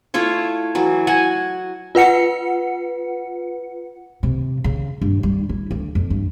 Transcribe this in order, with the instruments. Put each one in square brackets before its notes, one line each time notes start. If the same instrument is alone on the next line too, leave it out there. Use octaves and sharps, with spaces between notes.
[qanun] A3 E4 F4 C#5
E3 F#3
F#4 F#5 G#5
[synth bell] F4 B4 F#5 C#7
[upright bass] C3
C#3
G2
G3
E4
D2
F2
G2